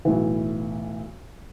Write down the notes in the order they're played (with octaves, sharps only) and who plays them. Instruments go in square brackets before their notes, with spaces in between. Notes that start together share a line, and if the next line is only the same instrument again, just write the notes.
[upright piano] B1 A2 E3